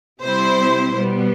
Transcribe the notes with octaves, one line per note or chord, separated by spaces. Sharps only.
C3 G3 C4 E4 C5
B2 G3 B3